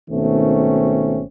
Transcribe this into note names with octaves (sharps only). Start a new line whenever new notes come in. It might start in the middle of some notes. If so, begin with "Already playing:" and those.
G#1 B2 D#3 A3 C4 C#4